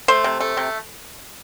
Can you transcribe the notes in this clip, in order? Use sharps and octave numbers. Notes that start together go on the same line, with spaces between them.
A3 C5
C3
A3
C3